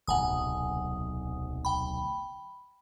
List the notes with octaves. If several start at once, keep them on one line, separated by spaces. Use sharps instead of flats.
D1 B1 C3 F#5 G#5 D#6
G5 B5